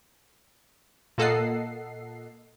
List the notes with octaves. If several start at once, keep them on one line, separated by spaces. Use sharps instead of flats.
A#2 A#3 A4 D#5 F#5 C7